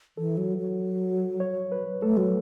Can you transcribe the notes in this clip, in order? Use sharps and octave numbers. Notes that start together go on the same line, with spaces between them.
E3 A4
F#3
F#3
C#5
B4
A3 A4
F#3